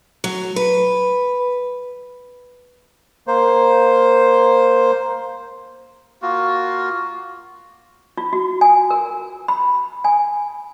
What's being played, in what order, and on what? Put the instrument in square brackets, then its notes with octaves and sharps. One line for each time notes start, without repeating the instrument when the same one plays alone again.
[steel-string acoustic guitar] F#3
B4
[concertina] A#3 C5
[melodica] A#3 F4 F#4
[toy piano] F4
F#4
G#5
A#4
B5
G#5